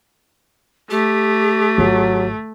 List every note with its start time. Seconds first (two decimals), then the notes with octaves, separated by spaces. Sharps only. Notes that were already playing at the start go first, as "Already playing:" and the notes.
0.90 A3 G4
1.78 G#1 F#3 F4